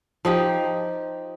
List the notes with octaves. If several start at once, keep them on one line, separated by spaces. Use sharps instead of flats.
F3 D#4 G4